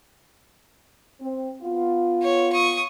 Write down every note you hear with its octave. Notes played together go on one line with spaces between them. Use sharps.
C4
B3 F4
C#5
C#6 D#6